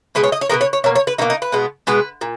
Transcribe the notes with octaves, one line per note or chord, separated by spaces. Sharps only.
B2 G#3 B3 B4
C#5
D#5
C#5
B2 G#3 B3 A#4
C#5
C#5
B2 A#3 C#5
C#5
B4
B2 A#3 D#4
D#4
B4
B2 G#3 B3
B2 G#3 B3 B4
A#2